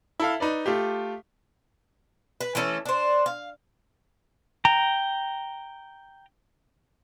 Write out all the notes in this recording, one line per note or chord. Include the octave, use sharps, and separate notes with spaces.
E4 A4 F5
D#4 B4 D5
A3 F4 G4
B4
E3 A3 C#4 A4
D4 C5
F5
G5 A#5